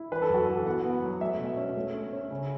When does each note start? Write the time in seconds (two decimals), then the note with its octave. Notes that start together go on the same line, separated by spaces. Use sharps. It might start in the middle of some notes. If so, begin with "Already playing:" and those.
Already playing: E4
0.12 E3 B4
0.22 A4
0.30 F#2 F#4
0.45 E3 A4
0.66 B3 F#5
0.85 B3
1.03 F#3
1.21 A3 E5
1.39 B2
1.57 C#4
1.77 A3
1.94 C#4
2.13 C#4
2.31 C#3